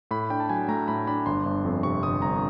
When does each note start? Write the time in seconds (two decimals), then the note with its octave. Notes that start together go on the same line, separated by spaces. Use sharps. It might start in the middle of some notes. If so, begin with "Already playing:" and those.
0.11 A2 B5
0.30 D4 G5
0.40 A5
0.49 F#3 G#5
0.69 A3 A#5
0.88 A2 B5
1.07 D4 B5
1.26 G1 C6
1.46 G1
1.65 F2
1.83 C3 C#6
2.03 G1 D#6
2.22 G1 A#5